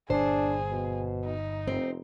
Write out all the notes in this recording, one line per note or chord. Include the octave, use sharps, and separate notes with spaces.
G1 A#2 D4 G#4 C5
B2
D#4
F1 C4